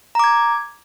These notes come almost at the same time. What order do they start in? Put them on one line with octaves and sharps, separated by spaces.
A#5 D6 G#6